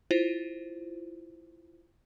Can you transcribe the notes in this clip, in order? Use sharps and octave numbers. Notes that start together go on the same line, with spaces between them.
E4 F4 C5